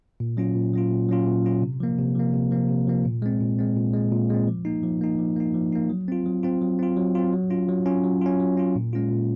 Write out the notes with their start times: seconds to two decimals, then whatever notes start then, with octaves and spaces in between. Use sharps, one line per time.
0.20 A#2
0.37 F#3 C#4 F4
0.55 A#2
0.73 F#3 C#4 F4
0.91 A#2
1.09 F#3 C#4 F4
1.26 A#2
1.45 F#3 C#4 F4
1.62 C3
1.80 F3 A#3
1.98 C3
2.15 F3 A#3
2.34 C3
2.51 F3 A#3
2.69 C3
2.87 F3 A#3
3.05 A#2
3.22 G#3 C4
3.40 A#2
3.59 G#3 C4
3.76 A#2
3.93 G#3 C4
4.12 A#2
4.30 G#3 C4
4.48 F3
4.65 A#3 D#4
4.83 F3
5.01 A#3 D#4
5.19 F3
5.36 A#3 D#4
5.55 F3
5.72 A#3 D#4
5.90 F#3
6.08 C4 F4
6.26 F#3
6.43 C4 F4
6.62 F#3
6.79 C4 F4
6.97 F#3
7.15 C4 F4
7.33 F#3
7.50 C#4 F4
7.69 F#3
7.86 C#4 F4
8.04 F#3
8.21 C#4 F4
8.40 F#3
8.57 C#4 F4
8.76 A#2
8.93 G#3 C#4 F4
9.11 A#2